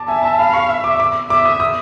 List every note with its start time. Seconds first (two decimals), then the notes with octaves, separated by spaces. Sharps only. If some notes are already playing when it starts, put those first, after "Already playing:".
Already playing: A5 D6
0.08 E5 G#5
0.23 A5
0.39 F5 B5
0.53 C#6
0.69 E5
0.84 D6
1.00 D6
1.30 E5 D6
1.46 D#6
1.60 D#6